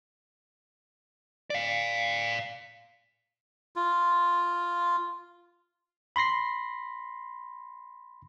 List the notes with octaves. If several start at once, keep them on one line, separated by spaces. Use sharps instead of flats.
D5 F5
F4
B5 C6 A#6 C7